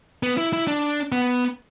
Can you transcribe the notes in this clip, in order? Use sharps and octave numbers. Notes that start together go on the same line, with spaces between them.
B3
E4
E4
D4
B3